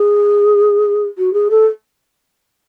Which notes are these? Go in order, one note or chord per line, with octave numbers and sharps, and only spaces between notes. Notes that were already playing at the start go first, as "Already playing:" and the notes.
Already playing: G#4
F#4
G#4
A4